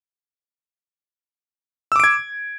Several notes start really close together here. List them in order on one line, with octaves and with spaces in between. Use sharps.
E6 D6 D7 G#6